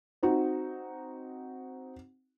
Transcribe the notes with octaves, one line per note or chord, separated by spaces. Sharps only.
C4 D#4 F#4